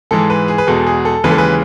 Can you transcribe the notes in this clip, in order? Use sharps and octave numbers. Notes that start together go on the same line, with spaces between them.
G#2 E3 G#3 A4
B4
G#4
B4
E2 B2 G#3 A4
G#4
A4
D#2 C#3 E3 G#3 B4
A4
B4